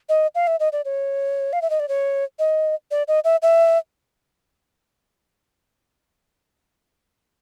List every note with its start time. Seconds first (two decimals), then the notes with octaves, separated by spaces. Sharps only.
0.09 D#5
0.35 F5
0.47 E5
0.60 D#5
0.73 D5
0.85 C#5
1.53 F5
1.62 E5
1.70 D#5
1.80 D5
1.89 C#5
2.39 D#5
2.91 D5
3.08 D#5
3.24 E5
3.42 E5